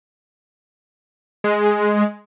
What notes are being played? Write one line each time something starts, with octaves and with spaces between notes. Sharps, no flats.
G#3